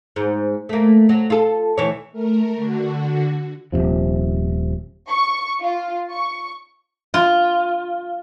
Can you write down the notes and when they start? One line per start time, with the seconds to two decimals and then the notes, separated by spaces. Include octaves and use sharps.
0.16 G#2
0.69 A3 A#3
1.09 F#3
1.30 F4 A4
1.77 D2 E3 C#5
2.12 A3 A#4
2.56 D3 F#4
3.72 D#1 C#2 C3 F3
5.08 C#6
5.62 F4
6.11 C#6
7.14 F4